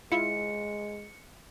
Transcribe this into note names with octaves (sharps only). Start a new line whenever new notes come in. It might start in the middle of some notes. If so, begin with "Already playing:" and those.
G#3 E4 F4 E5 C#7